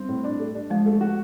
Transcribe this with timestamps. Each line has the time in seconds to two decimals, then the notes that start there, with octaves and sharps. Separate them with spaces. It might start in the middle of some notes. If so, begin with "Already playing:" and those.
Already playing: G3 C4
0.09 A2
0.24 D4
0.40 A3
0.55 D4
0.70 F3 G#3
0.86 A3
1.01 F#4